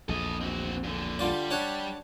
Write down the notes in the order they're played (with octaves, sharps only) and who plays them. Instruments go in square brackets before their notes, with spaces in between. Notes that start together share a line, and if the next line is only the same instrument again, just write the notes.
[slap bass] A#1 E2 [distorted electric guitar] A4 D#5
[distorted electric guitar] C4 F#4
A#2 D3
[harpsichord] D3 F4 D5 [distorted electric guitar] G3
[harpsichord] D4 C#5 F#5